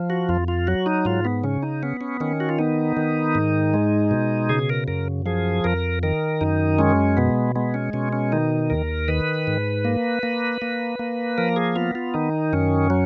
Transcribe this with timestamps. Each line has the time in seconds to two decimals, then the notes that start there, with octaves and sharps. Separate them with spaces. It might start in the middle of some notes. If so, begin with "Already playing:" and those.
Already playing: F3
0.10 F#4
0.29 F2 F4
0.48 F4
0.67 F#3 F#4
0.86 D#4
1.05 G#2 F4
1.25 B3
1.44 C#3 C#4
1.63 D#4
1.83 B3 C#4
2.01 C#4
2.20 D#3 C#4
2.40 F#4
2.49 F4
2.58 B3 D#4
2.97 D#3
3.35 G#2
3.74 G#3
4.11 B2
4.49 C#3 G#4
4.69 A#4
4.88 F#2 A#4
5.26 F3 G#4
5.64 F2 A#4
6.03 D#3 A#4
6.41 F#2 D#4
6.79 G#3 C#4
7.17 B2 B3
7.56 G#3 B3
7.74 C#4
7.93 B2 C#4
8.13 C#4
8.32 D#3 D#4
8.70 D#2 A#4
9.08 D#3 B4
9.47 G#2
9.85 A#3
10.23 A#3
10.62 A#3
10.99 A#3
11.38 F3 A#4
11.56 G#4
11.76 B3 F4
11.95 F4
12.14 D#3 D#4
12.53 F#2 C#4
12.90 F#3